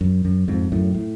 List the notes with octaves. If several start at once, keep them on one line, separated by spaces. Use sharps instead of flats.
F#2
F#2
F2 G#2
F#2 A2
A2